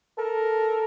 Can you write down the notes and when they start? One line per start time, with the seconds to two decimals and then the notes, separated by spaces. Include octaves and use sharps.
0.18 A4 A#4